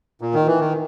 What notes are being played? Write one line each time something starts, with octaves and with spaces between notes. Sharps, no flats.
A#2
D#3
E3
D#3